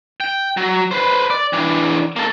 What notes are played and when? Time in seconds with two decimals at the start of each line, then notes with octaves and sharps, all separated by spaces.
0.20 G5
0.57 F#3
0.91 B4 C5
1.30 D5
1.53 E3 D4
2.16 A#3 A4